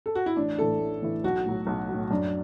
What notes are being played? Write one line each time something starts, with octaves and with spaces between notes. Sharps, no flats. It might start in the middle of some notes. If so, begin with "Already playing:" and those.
A4
F#4
E4
A1 D4
A2 E3 A3 E4 A4
A1
A2 E3 A3 E4
B1 F#4
A2 F#3
B1
F#3
A2
F#2 D4